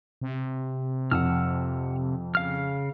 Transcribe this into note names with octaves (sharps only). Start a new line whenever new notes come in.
C3
F2 F#5 E6 F6
C#3 F5 F6